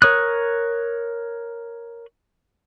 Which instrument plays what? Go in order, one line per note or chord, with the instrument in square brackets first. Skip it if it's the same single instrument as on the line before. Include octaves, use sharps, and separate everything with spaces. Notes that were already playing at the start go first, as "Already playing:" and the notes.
[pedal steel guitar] A#4 C#5 D#6 F#6